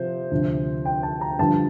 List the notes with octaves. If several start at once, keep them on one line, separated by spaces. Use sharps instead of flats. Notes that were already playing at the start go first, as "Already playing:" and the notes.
Already playing: C3 F3 C5
D2 C3 F3
G5
A5
A#5
G2 D3 F3 A5